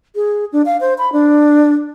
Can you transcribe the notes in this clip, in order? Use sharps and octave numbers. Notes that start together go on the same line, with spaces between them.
G#4
D4
F5
C5
B5
D4